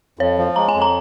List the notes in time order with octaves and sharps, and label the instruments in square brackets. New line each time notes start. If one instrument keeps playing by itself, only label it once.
[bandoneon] F2 [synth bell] C#5
[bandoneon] F3
[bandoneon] G#3 [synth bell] A#5
[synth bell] G#5
[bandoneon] F2
[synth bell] A#5